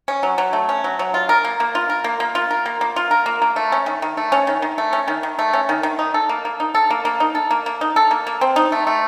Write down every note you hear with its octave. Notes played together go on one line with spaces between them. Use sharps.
C#4
F#3
F#3
A3
C#4
F#3
F#3
F4
A#4
A#3
A#3
F4
A#4
A#3
A#3
F4
A#4
A#3
A#3
F4
A#4
A#3
A#3
A3
C#4
D#3
D#3
A3
C#4
D#3
D#3
A3
C#4
D#3
D#3
A3
C#4
D#3
D#3
D#4
A4
A#3
A#3
D#4
A4
A#3
A#3
D#4
A4
A#3
A#3
D#4
A4
A#3
A#3
C4
D#4
A3
A3